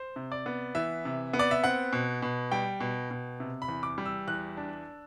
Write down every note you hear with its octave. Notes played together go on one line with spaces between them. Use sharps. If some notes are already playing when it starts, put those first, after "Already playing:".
Already playing: C5
C3
D5
B3
E3 E5
C3
B3
D5
E5
C4 F#5
B2
B2
G3 G5
B2
B2
C3
B5
E2
D6
G3
E6
E2 F#6
D4